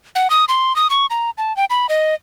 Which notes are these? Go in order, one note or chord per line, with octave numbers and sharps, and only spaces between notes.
F#5
D#6
C6
D#6
C#6
A#5
A5
G5
B5
D#5